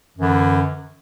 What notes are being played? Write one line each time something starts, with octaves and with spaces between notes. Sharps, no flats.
F#2 D3 E3